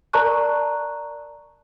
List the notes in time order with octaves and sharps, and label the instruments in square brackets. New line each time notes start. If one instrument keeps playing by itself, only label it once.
[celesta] A#4 D5 A5 A#5 C#6 F#6